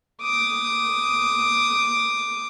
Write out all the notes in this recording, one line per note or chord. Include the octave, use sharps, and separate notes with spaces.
D6 D#6